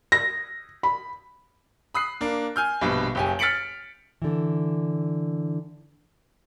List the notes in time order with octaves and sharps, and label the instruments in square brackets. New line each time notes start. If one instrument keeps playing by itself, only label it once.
[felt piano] A#6
B5
[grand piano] B5 D#6 F#6 C7
A#3 D4
G#5 F6 G6
A#1 G2 B2
F#1 G4 G#5
F6 A6 B6 C#7 D7 F#7
[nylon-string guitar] D3 E3